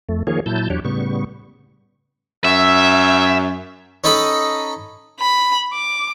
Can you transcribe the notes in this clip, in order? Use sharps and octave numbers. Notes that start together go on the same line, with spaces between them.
F2 A3
D#3 F3 A#3 G#4 C#5
A#2 F#3 E4 A5 G6
E2 F#3 D4 G4 C#5
A2 C#3 G3 B3 C#6
F#2 E5
C#4 D#4 A4 D#5 B5
B5
D6